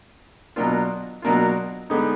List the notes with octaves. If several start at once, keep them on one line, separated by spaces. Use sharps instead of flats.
B2 F#3 A#3 D4 F4
B2 F#3 A#3 D4 F4
D3 G#3 B3 D#4